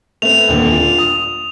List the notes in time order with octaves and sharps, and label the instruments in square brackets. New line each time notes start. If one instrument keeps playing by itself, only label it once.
[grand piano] A3 B3 C4 [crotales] F7
[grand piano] D#1 A#2 D3
D4 F4
D#6